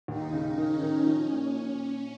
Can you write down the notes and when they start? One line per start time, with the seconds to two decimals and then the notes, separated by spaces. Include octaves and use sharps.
0.08 D#2 D#4
0.33 C#3
0.57 D#3 C#4
0.82 D#3
1.07 F3 C#4
1.32 A#2